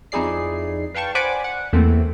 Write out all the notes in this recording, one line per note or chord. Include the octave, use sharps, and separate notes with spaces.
F2 D#4 E4 G#4 D5 C7
B4 F5 G5 A5 C#6
C5 D5 F#5 G#5 B5 D6
F#5
E2 A3 A#3 C4